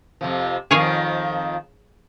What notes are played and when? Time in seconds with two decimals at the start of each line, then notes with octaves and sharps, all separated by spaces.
0.21 F2 C3 F3
0.71 F2 D#3 F3 G#4 C#5 F5